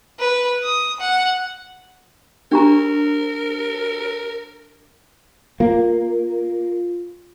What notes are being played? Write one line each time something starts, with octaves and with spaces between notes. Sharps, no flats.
B4
D#6
F#5
D4 G4 A#4 A#5
A#3 F4